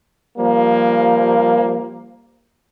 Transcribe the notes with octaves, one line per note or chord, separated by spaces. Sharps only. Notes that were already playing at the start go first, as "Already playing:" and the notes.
F3 G3 A#3